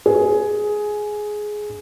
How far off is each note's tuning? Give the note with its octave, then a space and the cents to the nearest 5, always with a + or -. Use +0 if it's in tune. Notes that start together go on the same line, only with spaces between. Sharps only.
G#4 +10